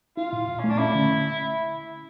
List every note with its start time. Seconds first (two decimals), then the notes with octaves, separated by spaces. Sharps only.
0.17 E4 F4
0.33 A#2
0.49 A#2
0.59 A3 C#4
0.70 D4
0.78 C#4 E4
0.95 D3